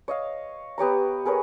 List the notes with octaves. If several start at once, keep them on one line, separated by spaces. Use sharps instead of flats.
C#5 D#5 F5
B3 G4 C#5 A#5
G#4 A#4 B4 C#5